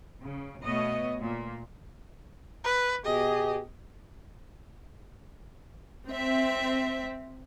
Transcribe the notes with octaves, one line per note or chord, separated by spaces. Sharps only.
C#3
B2 A3 B3 C#5 D#5
A#2
B4
B2 G4 G#4 D#5
C4 E5